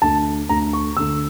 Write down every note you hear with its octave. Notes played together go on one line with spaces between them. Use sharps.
D2 D3 A3 A5
D2 D3 A3 A#5
C#6
D2 D3 A3 E6